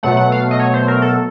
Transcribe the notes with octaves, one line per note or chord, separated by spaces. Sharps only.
B2 F#3 A3 F#5
F#5
F5
D#5
C#5
C5
A#4
A4